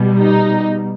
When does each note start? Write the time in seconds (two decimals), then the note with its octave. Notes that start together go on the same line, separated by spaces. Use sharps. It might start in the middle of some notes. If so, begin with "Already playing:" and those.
Already playing: B2 G3
0.20 D#4